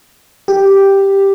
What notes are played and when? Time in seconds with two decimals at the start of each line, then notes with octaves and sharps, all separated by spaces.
0.48 G4